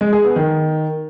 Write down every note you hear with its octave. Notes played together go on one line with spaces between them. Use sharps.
G#3
G#4
B3
D#3